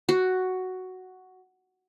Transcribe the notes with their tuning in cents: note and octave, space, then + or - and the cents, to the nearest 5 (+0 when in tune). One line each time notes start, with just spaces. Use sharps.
F#4 +5